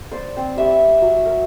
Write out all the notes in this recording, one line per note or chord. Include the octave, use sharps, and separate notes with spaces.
C5 D5
C4
G4 E5 B5 C#6
B5
F#3
A#4